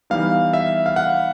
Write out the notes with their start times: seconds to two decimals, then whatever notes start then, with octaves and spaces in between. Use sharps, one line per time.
0.10 E3 G3 B3 D#4 F5
0.53 E5
0.86 F5
0.96 F#5